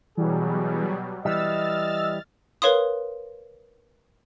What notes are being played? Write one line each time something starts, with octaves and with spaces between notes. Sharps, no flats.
B2 E3 F#3 G3 G#4
E3 G3 D#5 E6 F6 A6
A#4 B4 C#5 F5 C6 D#6